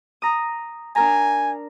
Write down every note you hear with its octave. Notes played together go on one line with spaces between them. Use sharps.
A#5 D#6
D4 A#4 G#5 A#5